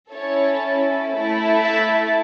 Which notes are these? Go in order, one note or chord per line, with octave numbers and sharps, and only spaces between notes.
C#4 E4 A4 C#5
A3 E4 A4
E5